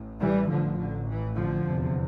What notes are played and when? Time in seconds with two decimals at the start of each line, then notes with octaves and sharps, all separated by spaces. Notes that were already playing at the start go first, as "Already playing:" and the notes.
Already playing: A1 A2
0.20 E3 G3
0.50 A1 A2 D3 F3
0.79 D3
1.08 E3
1.37 D3 F3
1.66 F1 E2 C3